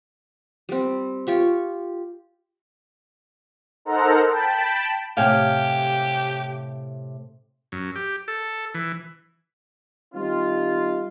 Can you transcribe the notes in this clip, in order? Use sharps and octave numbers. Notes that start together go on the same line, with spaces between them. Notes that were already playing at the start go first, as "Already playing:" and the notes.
G3 C4
F4 G4 C#6
D#4 A4 A#4 C5 F#5 A#5
G5 A5 B5
A2 C3 G4 F5 G5 G#5
F#2
G4
A4
E3
D#3 G3 C4 D#4 F4